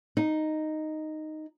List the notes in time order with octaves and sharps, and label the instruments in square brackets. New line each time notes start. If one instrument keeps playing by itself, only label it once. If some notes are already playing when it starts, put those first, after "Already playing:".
[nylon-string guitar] D#4